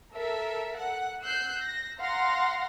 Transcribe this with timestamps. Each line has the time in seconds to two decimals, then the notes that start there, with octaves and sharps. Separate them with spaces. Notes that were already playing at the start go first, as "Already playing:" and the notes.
0.14 A4 A#4 E5
0.76 F#5
1.23 E6 F#6 G6 C7
1.63 A#6
2.00 F5 F#5 A#5 C6 A#6